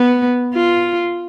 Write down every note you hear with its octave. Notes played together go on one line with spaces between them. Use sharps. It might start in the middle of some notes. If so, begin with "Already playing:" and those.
Already playing: B3
F4